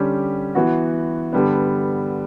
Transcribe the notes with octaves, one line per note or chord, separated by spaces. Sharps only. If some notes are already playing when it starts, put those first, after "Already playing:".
Already playing: D3 G3 C#4 G4
E3 B3 F#4
G2 D3 G3 B3